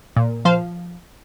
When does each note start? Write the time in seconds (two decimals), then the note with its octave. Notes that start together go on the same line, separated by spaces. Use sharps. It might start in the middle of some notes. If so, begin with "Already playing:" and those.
0.16 A#2
0.45 F3 C5 F5